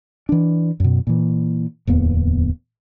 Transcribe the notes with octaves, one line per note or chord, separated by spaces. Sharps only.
E3 D4
F#2 B2
A#2 E3
D1 E2 A#3 B3